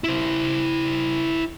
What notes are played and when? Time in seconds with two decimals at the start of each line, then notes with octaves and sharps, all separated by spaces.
0.04 E4 C5